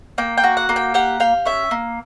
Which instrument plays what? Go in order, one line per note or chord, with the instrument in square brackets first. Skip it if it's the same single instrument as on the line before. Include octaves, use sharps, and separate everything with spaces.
[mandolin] A#3 G5
G5
F#4
F#5
A#3
G5
G4 F#5
G4 F5
C#4 E5
A#3